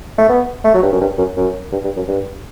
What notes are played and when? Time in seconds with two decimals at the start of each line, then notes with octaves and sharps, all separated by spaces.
0.18 A3
0.29 B3
0.65 A3
0.74 F#3
0.82 G2
0.92 F#2
1.01 G2
1.18 F#2
1.37 F#2
1.72 G2
1.84 G2
1.96 F#2
2.08 G2